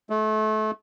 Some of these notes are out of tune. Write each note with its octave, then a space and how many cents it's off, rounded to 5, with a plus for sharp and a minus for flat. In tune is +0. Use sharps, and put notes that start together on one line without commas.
A3 -30